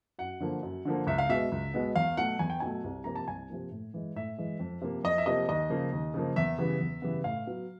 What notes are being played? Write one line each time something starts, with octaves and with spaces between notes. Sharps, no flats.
F#2 F#5
D3 F3 A#3
F#2
D3 F3 A#3
C#2 E5
F5
B2 G#3 B3 E5
C#2
B2 G#3 B3
E2 F5
B2 F#3 A3 F#5
E2 G#5
G5
B2 F#3 A3 G#5
C2
C3 F3 A#3 A#5
A5
C2 G#5
C3 F3 A#3
A2
E3 G#3
A2 E5
E3 G#3
F2
C3 F3 A#3
F2 D#5
E5
C3 F3 A#3 D#5
D#2 D#5
C#3 F3 A#3
D#2
C#3 F3 A#3
E2 E5
C#3 E3 G3 B3
E2
C#3 E3 G3 B3
A2 F5
F#3 B3